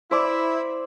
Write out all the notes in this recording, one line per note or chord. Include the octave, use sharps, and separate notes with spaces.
E4 C5 D5